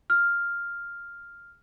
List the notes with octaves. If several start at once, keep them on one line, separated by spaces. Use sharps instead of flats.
F6